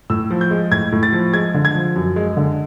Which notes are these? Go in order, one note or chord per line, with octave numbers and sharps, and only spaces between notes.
A2 E6
F3
G6
G#3
A2 G#6
A2
A6
F3
G#3 G#6
D3
G#6
F3
F#2
G#3
D3